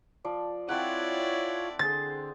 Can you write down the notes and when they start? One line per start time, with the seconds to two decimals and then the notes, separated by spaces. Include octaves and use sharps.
0.25 F3 D5
0.69 C4 E4 F4 A4 C#5 D5 F#5
1.79 D3 G#4 C5 A6